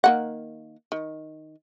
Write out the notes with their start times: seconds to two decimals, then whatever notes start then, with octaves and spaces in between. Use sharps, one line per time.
0.04 D#3 A#3 F#5
0.92 D#3